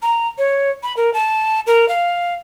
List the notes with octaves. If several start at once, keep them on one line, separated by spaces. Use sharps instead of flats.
A#5
C#5
B5
A#4
A5
A#4
F5